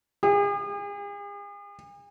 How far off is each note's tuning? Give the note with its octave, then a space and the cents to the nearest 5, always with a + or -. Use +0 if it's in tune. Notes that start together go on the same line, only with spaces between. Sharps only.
G#4 -45